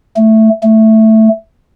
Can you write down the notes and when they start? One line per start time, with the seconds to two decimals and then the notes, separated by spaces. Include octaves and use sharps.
0.16 A3
0.63 A3